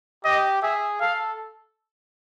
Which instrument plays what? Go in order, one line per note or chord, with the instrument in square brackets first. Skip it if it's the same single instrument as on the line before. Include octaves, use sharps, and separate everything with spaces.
[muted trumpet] G4 [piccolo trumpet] D#5
[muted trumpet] G#4 [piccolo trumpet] E5
[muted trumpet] A4 [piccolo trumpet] F5